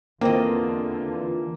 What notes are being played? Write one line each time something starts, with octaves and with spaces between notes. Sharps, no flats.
E2 D3 E3 A#3 C4 F4 D#5